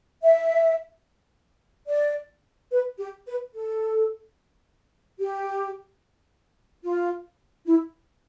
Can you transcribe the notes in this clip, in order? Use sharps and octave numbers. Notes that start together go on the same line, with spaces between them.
E5
D5
B4
G4
B4
A4
G4
F4
E4